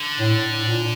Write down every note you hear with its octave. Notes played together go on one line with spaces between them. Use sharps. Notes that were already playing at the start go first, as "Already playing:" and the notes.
Already playing: D3
A2
A2
A#2